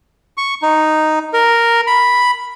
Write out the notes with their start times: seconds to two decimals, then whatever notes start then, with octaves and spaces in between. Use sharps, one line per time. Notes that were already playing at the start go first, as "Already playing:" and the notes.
0.37 C#6
0.62 D#4
1.33 A#4
1.87 B5